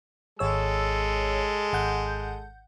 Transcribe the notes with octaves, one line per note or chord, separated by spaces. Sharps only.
G#1 G#3 A4 C#5 E6
G#1 F#5 G6